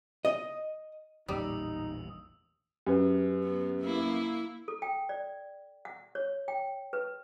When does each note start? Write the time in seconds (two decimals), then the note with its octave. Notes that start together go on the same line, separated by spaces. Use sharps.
0.25 D#5
1.28 A1 E2 A#2 G3 D#4 D#6 E6
2.87 F#2 G4 B4
3.43 B3
3.81 A#3 E4
4.68 A4
4.82 G5
5.09 D5
5.85 F#5
6.15 C#5
6.48 G5
6.93 B4